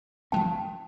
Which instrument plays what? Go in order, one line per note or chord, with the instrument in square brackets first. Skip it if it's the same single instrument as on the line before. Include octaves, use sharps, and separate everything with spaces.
[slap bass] F3 G#3 C#4 [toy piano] G5 A5